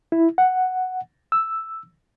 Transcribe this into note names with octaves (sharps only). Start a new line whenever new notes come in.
E4
F#5
E6